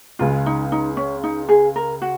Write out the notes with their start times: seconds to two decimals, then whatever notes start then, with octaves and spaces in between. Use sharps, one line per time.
0.19 C#2 C#3 G#3 F4
0.46 D#4
0.72 D#4
0.97 C#4
1.24 D#4
1.49 G#4
1.76 A#4
2.02 F#4